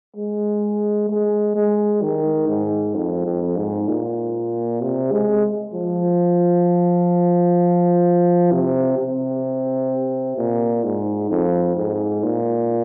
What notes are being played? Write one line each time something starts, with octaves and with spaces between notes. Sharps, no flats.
G#3
G#3
G#3
D#3
G#2
F2
F2
G#2
A#2
C3
G#3
F3
C3
C3
A#2
G#2
F2
G#2
A#2